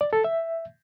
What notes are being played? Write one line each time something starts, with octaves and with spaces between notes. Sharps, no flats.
D5
A4
E5